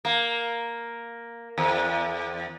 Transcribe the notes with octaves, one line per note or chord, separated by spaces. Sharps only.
A#3
E2